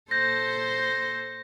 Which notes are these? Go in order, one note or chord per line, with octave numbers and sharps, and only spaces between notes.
A#2 A4 C5 G6 A#6